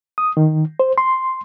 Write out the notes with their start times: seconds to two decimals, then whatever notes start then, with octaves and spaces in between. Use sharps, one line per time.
0.18 D#6
0.37 D#3
0.80 C5
0.98 C6